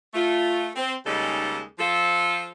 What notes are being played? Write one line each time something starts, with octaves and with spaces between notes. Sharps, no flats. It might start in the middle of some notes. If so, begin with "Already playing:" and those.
A3 F4
C4
D#2 C#3 G3 G#3 D#4 A4
F3 F4 A4